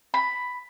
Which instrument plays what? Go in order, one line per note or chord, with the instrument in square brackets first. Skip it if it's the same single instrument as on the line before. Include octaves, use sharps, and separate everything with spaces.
[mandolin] B5